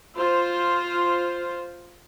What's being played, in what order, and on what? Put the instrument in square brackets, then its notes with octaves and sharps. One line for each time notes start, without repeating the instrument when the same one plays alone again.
[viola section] F4 C5